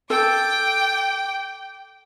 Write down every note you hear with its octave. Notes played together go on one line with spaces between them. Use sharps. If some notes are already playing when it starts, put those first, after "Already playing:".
A4 G5 D6